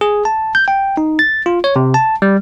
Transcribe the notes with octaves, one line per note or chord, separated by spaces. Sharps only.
G#4
A5
G6
G5
D#4
A6
F4
C#5
C3
A5
G3